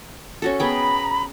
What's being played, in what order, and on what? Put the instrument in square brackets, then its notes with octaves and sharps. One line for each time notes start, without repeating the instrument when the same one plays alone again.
[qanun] C#4 F#4 A4
[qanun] B3 G#4 G5 [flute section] A#5 B5